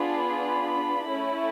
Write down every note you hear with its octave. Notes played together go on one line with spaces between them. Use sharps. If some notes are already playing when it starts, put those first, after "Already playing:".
Already playing: B3 D4 F4 G#4 B5
A3 C#4 E4